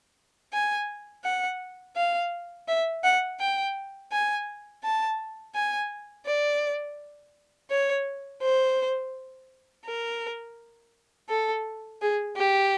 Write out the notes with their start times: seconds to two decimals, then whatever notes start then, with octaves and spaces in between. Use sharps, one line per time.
0.53 G#5
1.24 F#5
1.96 F5
2.68 E5
3.04 F#5
3.40 G5
4.12 G#5
4.84 A5
5.55 G#5
6.26 D5
7.70 C#5
8.43 C5
9.86 A#4
11.29 A4
12.02 G#4
12.36 G4